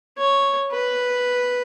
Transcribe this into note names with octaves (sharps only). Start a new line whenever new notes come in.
C#5
B4